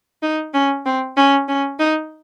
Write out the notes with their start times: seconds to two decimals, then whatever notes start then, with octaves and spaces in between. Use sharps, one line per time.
0.23 D#4
0.54 C#4
0.86 C4
1.17 C#4
1.48 C#4
1.79 D#4